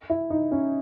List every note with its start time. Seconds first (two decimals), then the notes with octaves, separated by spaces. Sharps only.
0.10 E4
0.30 D#4
0.51 C#4